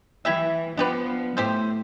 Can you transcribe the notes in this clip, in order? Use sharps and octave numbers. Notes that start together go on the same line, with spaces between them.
E3 E4 G4 E5
F3 B3 D4 G4 B4
A2 G4 A4 C5